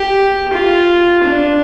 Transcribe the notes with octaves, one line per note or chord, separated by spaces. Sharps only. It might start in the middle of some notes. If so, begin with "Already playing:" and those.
Already playing: G4
F4
D4